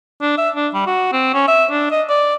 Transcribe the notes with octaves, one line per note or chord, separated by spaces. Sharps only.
D4
E5
D4
G3
F#4
C4
C#4
E5
D4
D#5
D5